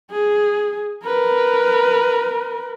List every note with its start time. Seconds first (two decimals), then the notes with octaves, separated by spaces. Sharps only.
0.11 G#4
1.05 A#4 B4